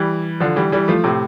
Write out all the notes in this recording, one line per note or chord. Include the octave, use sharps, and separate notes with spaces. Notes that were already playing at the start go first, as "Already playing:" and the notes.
Already playing: E3 G3
D3 F3
E3 G3
E3 G3
F3 A3
A2 C3